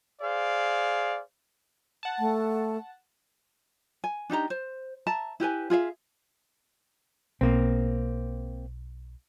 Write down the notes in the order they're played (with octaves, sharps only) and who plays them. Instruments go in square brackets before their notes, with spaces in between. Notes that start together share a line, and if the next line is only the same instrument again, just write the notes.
[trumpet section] G#4 C5 D5 F5
[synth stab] F#5 A5
[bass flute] A3
[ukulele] G#5
D4 D#4 G4 A#5
C5
E5 A5 A#5
E4 G4 B4 G#5
F4 G#4 E5 F5
[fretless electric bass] B1 [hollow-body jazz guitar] A#3 C4